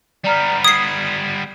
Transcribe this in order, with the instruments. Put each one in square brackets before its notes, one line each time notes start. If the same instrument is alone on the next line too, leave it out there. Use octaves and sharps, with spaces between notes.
[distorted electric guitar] G3 B3 [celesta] D5 A#5 F6
[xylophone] D#6 C7 [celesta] G#6